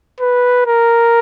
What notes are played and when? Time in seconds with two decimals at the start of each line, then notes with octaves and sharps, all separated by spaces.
0.21 B4
0.67 A#4